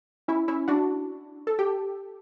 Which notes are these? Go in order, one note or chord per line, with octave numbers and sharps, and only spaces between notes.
C#4 E4
C#4 E4
D4 F#4
A4
G4